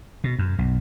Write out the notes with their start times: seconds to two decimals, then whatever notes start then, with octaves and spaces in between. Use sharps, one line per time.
0.24 B2
0.39 F#2
0.59 B1